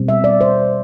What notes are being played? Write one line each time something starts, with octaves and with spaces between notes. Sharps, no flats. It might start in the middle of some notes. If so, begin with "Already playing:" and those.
Already playing: B2 G3 C4
E5
D5
C5